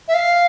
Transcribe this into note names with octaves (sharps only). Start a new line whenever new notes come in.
E5
F5